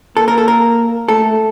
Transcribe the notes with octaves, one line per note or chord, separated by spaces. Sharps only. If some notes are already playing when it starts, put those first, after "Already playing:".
A#3 A4
A#4
A4
A#4
A3 A4